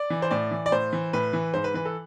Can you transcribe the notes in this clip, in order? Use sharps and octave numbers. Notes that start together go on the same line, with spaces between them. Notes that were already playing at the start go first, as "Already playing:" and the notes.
Already playing: D5
E3
C5
A2 D5
E3
D5
A2 C5
E3
A2 B4
E3
G#2 C5
B4
E3 B4
A4